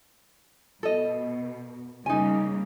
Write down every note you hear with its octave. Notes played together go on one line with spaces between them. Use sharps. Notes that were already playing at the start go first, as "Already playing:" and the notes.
B2 A4 D#5
C#3 G3 A#3 D#4 G#5